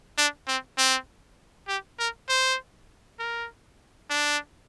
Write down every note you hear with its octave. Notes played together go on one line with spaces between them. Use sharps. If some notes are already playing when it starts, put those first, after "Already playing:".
D4
C4
C4
G4
A#4
C5
A#4
D4